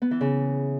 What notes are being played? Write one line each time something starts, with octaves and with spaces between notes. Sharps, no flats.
B3
E3
C#3